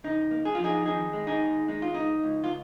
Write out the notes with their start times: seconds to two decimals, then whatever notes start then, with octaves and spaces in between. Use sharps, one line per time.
0.04 C#3 D#4
0.31 A#3
0.45 G#4
0.55 F3 F4
0.64 D#4 G#4
0.86 D#3 D#4 G#4
1.13 G#3
1.27 D#4 G#4
1.41 D#2
1.68 G#3 D#4
1.82 F4
1.94 C#2 D#4
2.23 C#2
2.44 F4